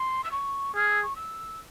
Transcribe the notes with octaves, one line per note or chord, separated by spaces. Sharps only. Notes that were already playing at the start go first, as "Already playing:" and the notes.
Already playing: C6
E6
C#6
G#4 F6
E6
C#6
E6